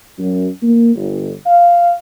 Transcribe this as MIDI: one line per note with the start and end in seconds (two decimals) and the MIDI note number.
0.19 0.47 42
0.62 0.95 58
0.95 1.31 31
1.46 1.92 77